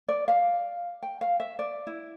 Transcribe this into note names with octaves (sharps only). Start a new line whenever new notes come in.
D5
F5
G5
F5
E5
D5
E4